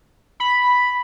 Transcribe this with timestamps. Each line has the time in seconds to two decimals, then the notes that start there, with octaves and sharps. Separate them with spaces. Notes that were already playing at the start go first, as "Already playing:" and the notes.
0.40 B5